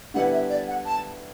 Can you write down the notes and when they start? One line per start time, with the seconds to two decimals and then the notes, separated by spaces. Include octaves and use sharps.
0.14 D3 G3 B3 E4 B4 F#5
0.32 E5
0.50 D5
0.68 F#5
0.85 A5